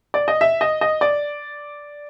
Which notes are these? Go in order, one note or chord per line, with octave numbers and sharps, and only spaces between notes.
D5
D#5
E5
D#5
D#5
D5